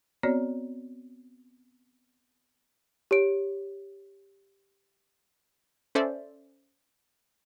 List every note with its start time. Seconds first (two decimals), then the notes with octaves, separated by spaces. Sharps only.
0.23 B3 C4 F#4 C#5 D5
3.11 G4 C#5 D7
5.95 C#4 A4 C5 D5 E5